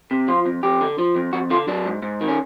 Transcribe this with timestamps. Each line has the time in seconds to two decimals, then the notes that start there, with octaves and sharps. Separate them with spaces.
0.11 C3
0.28 F3 F4
0.46 F2
0.63 F2 G4
0.81 D3
0.98 F3
1.16 F2
1.33 F2 F#4
1.50 D3 F4
1.68 F#3 D4
1.86 G#2
2.02 G#2
2.21 D#3
2.28 C#4